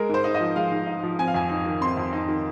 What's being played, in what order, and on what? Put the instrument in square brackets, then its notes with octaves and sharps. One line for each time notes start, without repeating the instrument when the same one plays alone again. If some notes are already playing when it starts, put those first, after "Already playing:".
Already playing: [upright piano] G#3 A#4
G#2 C5
D#4
D#5
F3
G#3 F5
G#2
D#4
F3
C4 G#5
F5
F2 G#5
D#4
D#3
C4 C6
F2
D#4
D#3